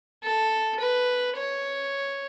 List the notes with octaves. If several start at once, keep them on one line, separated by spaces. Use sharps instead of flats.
A4
B4
C#5